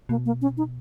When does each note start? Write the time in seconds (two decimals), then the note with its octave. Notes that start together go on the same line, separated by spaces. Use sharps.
0.09 B2 A#3
0.26 A#3
0.42 C#4
0.57 D#4